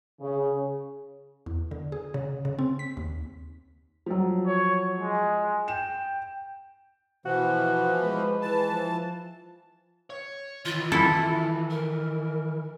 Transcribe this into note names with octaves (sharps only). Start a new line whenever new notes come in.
C#3
E2
D3
G#4
C#3
C#3
C4
B6
D#2
F3 F#3
C#5
G#3
G5 E7
B2 E3 F3 F#4
G#3 B4
E3 A5
F3
C#5
D#3 E3 F4
E4 A4
A#4